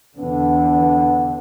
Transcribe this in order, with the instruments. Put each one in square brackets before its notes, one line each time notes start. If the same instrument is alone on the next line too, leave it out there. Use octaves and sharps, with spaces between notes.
[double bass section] E2 D3 [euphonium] B3